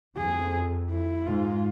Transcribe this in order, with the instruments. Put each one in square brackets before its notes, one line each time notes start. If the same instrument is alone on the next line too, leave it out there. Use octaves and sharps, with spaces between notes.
[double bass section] F2 [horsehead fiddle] G#4
[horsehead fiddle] E4
[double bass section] G#2 [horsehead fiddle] F4